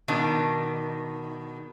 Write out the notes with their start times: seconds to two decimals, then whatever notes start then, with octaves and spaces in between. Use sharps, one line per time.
0.08 B2 D#3 D4